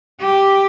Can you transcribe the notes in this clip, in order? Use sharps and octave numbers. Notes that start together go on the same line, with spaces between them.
G4